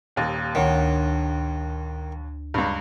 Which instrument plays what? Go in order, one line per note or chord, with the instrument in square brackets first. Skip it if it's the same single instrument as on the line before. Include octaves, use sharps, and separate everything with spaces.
[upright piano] D#1 D#2
[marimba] D2 D4 C#5 [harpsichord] D#3
[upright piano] C#2 G2